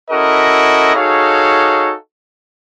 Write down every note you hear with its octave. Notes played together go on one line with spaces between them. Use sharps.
C#4 E4 F#4 A4 A#4 D#5
D#4 F#4 G#4 A4 C#5 F5